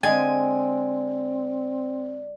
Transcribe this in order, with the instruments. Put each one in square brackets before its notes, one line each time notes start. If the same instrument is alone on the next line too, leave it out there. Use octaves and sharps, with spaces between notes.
[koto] D3 G#3 [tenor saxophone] C4 [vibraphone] D5 [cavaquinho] G#5